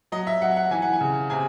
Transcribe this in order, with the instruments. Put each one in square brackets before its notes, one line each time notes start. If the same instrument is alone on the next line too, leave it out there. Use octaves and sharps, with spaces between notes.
[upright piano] F#3 D#5
E5
F#3 F#5
F#5
E3 G#5
F#5
G#5
C#3
C3 G#5